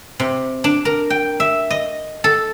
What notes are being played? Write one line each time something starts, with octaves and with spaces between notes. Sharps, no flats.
C3
D4
A#4
G5
E5
D#5
A4